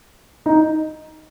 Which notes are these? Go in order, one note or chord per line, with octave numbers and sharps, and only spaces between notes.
D#4